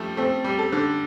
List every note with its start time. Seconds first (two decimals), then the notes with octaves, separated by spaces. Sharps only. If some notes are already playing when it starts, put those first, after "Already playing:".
Already playing: F3 G3 A3 A4
0.17 A3 C4
0.44 G3
0.59 A4
0.72 D3